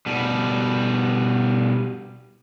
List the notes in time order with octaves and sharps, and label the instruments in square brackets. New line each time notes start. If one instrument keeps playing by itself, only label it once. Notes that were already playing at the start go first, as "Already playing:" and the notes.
[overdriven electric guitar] B2 G3